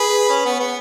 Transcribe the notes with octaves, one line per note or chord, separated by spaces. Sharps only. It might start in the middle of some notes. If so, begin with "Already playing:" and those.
Already playing: G#4 B4
C#4
B3
B3